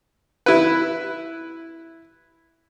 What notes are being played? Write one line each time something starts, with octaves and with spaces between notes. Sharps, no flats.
E4 B4